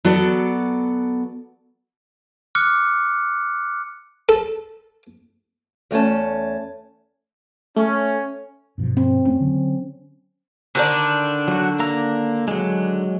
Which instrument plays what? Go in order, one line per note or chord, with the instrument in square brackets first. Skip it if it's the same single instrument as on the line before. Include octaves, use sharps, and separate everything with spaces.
[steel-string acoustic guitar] F#3 B3 F#4 A4 D5
[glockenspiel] D6 F6 F#6 C#7
[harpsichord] A4
[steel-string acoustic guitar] E2 A3 C#4 A5
[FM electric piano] A3 [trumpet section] C#4
[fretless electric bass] G2 B2 F3
[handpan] C4
[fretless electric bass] F2 A3 C4 [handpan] C#4
[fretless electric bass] D3 F#3
[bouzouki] D3 D#3 D4
[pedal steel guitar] F#3 F#4
A#3 A#5 E6
F#3 G#3